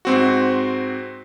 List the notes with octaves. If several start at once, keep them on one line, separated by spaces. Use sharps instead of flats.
G#2 C4 F#4